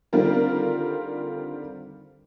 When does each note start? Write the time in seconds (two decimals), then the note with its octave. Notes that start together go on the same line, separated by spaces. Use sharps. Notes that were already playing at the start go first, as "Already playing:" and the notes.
0.13 D3 D#3 G3 C4 F4 A#4